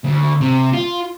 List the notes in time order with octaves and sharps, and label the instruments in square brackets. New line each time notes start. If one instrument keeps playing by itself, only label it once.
[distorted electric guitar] D2
C3
F4